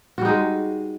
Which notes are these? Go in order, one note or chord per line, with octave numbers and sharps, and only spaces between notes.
G3 G#3 D#4 F#4